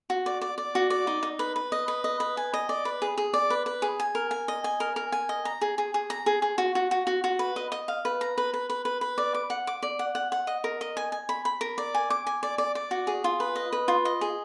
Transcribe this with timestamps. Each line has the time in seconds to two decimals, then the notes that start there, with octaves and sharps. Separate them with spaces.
0.10 F#4
0.26 D5
0.41 D5
0.58 D5
0.75 F#4
0.90 D5
1.07 D#4
1.23 D#4
1.39 B4
1.56 B4
1.72 D#5
1.88 B4
2.04 D#5
2.20 B4
2.37 G#5
2.54 D#5
2.69 D5
2.85 B4
3.02 G#4
3.18 G#4
3.34 D5
3.50 B4
3.66 B4
3.82 G#4
4.00 G#5
4.15 A#4
4.31 G#5
4.48 D#5
4.64 G#5
4.80 A#4
4.96 A#4
5.12 G#5
5.29 D#5
5.45 A#5
5.61 G#4
5.78 G#4
5.94 G#4
6.10 A#5
6.26 G#4
6.42 G#4
6.58 F#4
6.75 F#4
6.91 F#4
7.07 F#4
7.24 F#4
7.39 B4
7.56 D#5
7.72 D#5
7.88 F5
8.05 B4
8.21 A#5
8.38 B4
8.54 B4
8.70 B4
8.85 B4
9.01 B4
9.18 D5
9.34 D6
9.50 F#5
9.67 D6
9.83 D5
9.99 F#5
10.15 F#5
10.32 F#5
10.47 D#5
10.64 A#4
10.81 D#5
10.97 G#5
11.12 G#5
11.29 B5
11.45 B5
11.61 A#4
11.78 D5
11.94 G#5
12.10 D6
12.27 G#5
12.43 D5
12.58 D5
12.75 D5
12.91 F#4
13.07 G#4
13.24 F4
13.40 B4
13.56 D#5
13.73 B4
13.88 F4
14.05 D#5
14.21 G#4